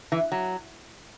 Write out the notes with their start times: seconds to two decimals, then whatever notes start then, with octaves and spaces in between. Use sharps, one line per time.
0.12 E3
0.32 F#3